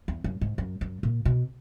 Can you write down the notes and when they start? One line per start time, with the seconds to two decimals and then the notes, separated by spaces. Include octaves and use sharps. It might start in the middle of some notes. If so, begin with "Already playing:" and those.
0.08 E2
0.24 F#2
0.41 G#2
0.58 F#2
0.81 F#2
1.03 A#2
1.25 B2